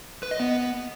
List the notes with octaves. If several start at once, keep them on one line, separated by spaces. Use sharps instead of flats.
B4
D#5
B3